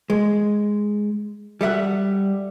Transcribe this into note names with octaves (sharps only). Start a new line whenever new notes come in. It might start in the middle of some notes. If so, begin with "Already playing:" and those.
G#3
G3 A4 E5 F#5